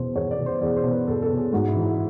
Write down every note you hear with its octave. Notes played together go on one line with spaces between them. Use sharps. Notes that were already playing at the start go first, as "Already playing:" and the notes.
Already playing: E2 B2 C5
E2 C#5
D5
B2
C5
E2 D5
C5
B2
B4
E2 A4
A4
B2
G#4
G#2 F#4
E4
E3
E4
E4